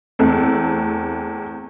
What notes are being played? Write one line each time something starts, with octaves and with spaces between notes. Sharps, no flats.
E2 A3 C4